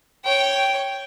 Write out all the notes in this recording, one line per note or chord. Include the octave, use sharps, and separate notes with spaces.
C#5 G5